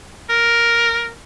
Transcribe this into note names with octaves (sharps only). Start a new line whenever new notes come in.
A#4